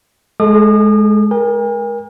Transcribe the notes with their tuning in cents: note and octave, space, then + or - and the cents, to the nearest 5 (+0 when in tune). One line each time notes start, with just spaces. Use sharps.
G#3 +20 A4 -15 D#6 -40
A#4 +30 G#5 -45